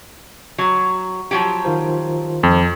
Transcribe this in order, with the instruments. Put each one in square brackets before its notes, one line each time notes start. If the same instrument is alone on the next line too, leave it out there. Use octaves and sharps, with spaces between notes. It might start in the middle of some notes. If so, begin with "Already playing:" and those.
[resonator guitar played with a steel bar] F#3
F3 F#3 G4
[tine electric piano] D#3 F4 C5
[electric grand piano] F2